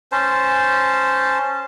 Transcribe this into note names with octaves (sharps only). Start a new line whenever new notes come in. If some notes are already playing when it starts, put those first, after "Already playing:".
C#4 C5 A5